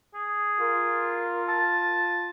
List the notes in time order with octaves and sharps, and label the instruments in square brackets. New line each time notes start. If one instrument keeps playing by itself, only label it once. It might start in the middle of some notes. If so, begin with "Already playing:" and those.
[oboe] G#4
[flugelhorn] F4 [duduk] A#4
[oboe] A5